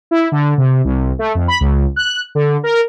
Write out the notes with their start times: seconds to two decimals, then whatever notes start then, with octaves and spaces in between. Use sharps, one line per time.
0.11 E4
0.32 D3
0.58 C3
0.84 C2
1.19 A3
1.35 F2
1.48 B5
1.61 C#2
1.96 F#6
2.35 D3
2.63 A#4